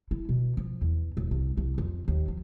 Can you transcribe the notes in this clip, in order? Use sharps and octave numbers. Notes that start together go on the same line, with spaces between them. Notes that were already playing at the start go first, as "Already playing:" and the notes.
E4
B2
F3
E2
D1
C2
C2
F2
D#2
F3